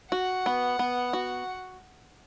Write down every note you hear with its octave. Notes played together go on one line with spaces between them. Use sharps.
F#4 F#5
B3
B3
F#4